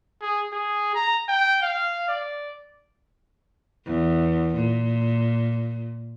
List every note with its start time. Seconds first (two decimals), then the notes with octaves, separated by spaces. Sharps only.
0.22 G#4
0.53 G#4
0.95 A#5
1.28 G5
1.62 F5
2.09 D5
3.86 E2
4.56 A#2